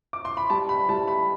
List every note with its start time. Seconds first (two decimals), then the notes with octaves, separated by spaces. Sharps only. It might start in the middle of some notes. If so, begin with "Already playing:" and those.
0.13 D6
0.25 C6
0.37 B5
0.50 G3 A5
0.69 B5
0.89 G3 A5
1.08 B5